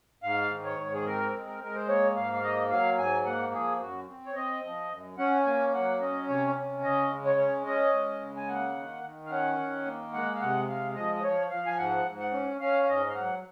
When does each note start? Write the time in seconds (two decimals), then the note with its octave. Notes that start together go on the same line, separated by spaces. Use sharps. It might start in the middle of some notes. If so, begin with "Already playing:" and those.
0.23 G#2 F5
0.51 D#3
0.65 C#5
0.79 G#2
0.94 G#4
1.06 C4 A#4
1.34 G#3
1.46 A#4
1.61 G#3 A#4
1.76 C5
1.88 A#3 C#5
2.16 G#2 F5
2.33 F5
2.43 A#3 D#5
2.71 F#3 F5
2.98 G#2 G#5
3.25 A#3 F#5
3.53 F3 G#4
3.81 F#2 F#4
4.08 C4
4.26 C#5
4.35 C4 D#5
4.63 F3
4.90 F#2
5.18 C#4 F#5
5.46 A#3 G#5
5.74 F#3 F#5
6.00 C#4 D#5
6.28 C3 C#5
6.56 C#4
6.83 C#3 D#5
7.10 G#3
7.25 C#5
7.39 C#4
7.66 C#4 D#5
7.94 G#3
8.21 C#3
8.36 G#5
8.48 A#3 F#5
8.75 D#3
9.03 D#3
9.26 F5
9.31 C#4 F#5
9.59 D#3
9.85 A#3
10.13 G#3 F#5
10.35 F5
10.41 C3 F#5
10.69 G#3 F5
10.95 F3 D#5
11.15 D#5
11.23 F3 C#5
11.50 F3 F5
11.66 G#5
11.78 G#2 F#5
12.06 G#2
12.20 F#5
12.33 C#4
12.60 C#4 F5
12.83 F5
12.89 G#2 D#5
13.10 F5
13.15 F#3 F#5